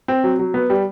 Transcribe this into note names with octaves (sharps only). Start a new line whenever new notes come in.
C4
F#3
F#3
B3
G3